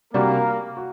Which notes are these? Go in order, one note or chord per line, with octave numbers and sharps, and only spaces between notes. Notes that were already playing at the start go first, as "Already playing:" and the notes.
C3 G3 A#3 D4 F#4 A#4
F#4